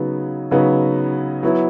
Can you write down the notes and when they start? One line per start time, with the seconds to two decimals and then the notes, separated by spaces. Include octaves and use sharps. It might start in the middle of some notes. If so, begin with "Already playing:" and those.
Already playing: C#3 F#3 B3 D#4
0.51 C#3 F#3 B3 D#4
1.43 F#3 B3 E4